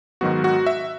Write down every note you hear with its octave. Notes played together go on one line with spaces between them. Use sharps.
G#2 D#3 F#3 B3 F#4
F#4
E5